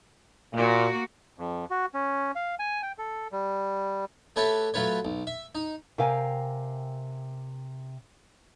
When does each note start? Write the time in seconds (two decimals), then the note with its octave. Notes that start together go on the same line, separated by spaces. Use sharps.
0.54 A#2 A#3 F#4
1.38 F2
1.71 F#4
1.94 C#4
2.35 F5
2.59 G#5
2.83 G5
2.98 A4
3.32 G3
4.36 A3 G4 B4 C#5 E5 A5
4.74 F#3 A3 F4 B4 C#5
5.05 B1
5.27 E5
5.55 D#4
5.98 C3 A#4 F5 G5 G#5